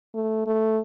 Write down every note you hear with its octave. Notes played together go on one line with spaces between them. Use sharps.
A3
A3